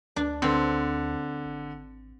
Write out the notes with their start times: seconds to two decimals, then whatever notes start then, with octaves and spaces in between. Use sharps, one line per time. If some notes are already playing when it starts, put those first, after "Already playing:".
0.16 D2 D4
0.42 D3 C4
1.45 G#1